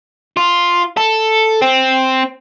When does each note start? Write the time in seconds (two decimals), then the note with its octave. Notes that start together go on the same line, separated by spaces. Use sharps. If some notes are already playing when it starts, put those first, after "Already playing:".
0.37 F4
0.97 A4
1.62 C4